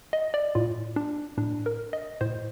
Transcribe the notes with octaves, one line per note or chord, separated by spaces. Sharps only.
D#5
D5
A2 F4
D4
A2 D4
A#4
D#5
A2 C5